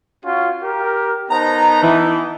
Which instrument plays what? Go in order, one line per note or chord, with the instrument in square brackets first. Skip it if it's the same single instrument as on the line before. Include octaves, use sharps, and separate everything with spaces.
[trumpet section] C#4 F4 F#4
G4 A#4
[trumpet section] B3 D#4 A5 [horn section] A#4 C5 A#5
[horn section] E3